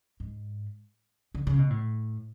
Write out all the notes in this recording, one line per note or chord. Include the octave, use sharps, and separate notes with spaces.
G#2
D3
C#3
B2
A2